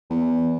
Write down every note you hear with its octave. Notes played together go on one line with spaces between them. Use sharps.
E2